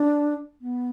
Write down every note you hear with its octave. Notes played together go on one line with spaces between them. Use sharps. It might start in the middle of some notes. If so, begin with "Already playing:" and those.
Already playing: D4
B3